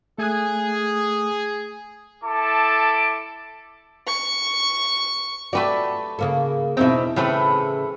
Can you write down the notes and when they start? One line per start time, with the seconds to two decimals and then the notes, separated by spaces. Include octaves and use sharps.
0.18 A3 G#4 F#6
2.24 E4 A4 A5 D6
4.07 C#6
5.53 A3 F#4 G4 B4 D5
6.19 C#3 A#3 A4
6.77 E2 B2 C4 D#4 E4
7.16 A2 C#3 E3 A3 C4 B4